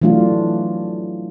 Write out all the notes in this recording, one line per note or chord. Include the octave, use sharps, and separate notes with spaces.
E3 F#3 A3 D4 F4